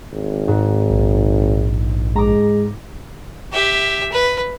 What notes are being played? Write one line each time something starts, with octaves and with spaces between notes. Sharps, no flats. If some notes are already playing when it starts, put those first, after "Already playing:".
G#1
G#2
A#1
G#3 A#5 D6
G4 E5
B4